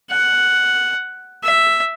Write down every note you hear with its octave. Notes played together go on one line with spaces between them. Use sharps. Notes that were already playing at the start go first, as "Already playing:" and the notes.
F#5
E5